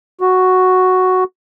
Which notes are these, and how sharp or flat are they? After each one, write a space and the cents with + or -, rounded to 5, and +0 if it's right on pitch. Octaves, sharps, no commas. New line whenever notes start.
F#4 +0